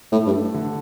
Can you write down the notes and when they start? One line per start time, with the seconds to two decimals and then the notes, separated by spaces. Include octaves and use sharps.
0.12 A2 A3
0.27 G2
0.33 A4
0.54 D3